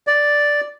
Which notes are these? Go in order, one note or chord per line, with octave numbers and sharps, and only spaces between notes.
D5